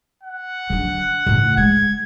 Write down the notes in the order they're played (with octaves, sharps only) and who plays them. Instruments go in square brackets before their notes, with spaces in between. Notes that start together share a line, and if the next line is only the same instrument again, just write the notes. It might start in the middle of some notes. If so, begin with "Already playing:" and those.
[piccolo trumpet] F#5
[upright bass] D3 F#3
A2 C#3
[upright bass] G#3 [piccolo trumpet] G#6